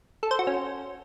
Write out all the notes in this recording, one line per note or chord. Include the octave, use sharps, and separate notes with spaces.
A4
C5
F#4
C#4